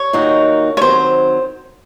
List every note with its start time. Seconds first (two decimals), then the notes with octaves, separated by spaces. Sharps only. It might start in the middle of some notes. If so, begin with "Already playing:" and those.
Already playing: C#5
0.13 D#2 D#3 A#3 D#4 F#4
0.77 C#5
0.82 D#3 F#3 C4 C5